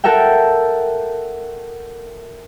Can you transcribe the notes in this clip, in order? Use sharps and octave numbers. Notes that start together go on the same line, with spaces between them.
F#4 A4 A#4 E5 G5